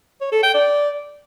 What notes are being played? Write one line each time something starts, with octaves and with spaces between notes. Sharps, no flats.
C#5
A4
G5
D5